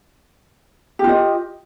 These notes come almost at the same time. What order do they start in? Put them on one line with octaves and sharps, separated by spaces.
G4 F4 D#5